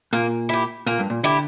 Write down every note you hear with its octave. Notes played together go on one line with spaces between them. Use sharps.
A#2 A#3
E4 G4
A#2 A#3
G2
A#2
D3 E4 G4